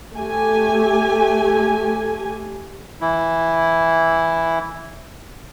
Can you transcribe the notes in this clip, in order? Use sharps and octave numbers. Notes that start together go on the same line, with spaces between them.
A3 G4 G#5
E3 E4